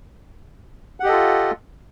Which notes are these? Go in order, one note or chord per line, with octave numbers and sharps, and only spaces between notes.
F4 G4 A4 D#5 F#5